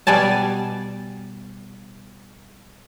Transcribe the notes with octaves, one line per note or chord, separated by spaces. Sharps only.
B2 G3 D5 G#5 A5